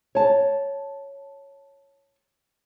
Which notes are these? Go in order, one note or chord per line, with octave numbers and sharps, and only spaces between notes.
C#5 A5